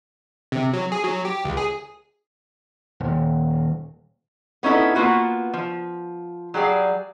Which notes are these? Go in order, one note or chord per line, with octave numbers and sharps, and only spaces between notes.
C3
F#3
G#4
F#3
G4
C#2
G#4
D#1
B3 C#4 D#4 E4 A4
A#3 B3 F4 F#4 B4
F3
F#3 G3 G#4 D5 F5